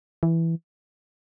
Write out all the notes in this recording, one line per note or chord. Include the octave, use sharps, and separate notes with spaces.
E3